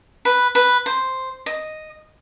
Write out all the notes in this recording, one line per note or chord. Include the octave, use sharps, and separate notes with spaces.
B4
B4
C5
D#5